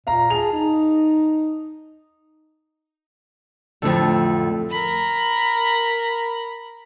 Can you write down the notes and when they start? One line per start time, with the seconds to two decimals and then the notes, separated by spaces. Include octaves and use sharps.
0.07 A#2 F5 A#5
0.30 G#4 A5 F7
0.52 D#4
3.82 F2 A2 D3
4.70 A#4 B5